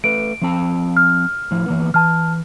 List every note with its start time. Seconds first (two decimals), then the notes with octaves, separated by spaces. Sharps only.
0.04 A3 B4 D7
0.42 F3 C4 A5
0.97 F6
1.51 A2 F3 E4
1.66 E3 A#3 B3
1.94 E3 A5 F6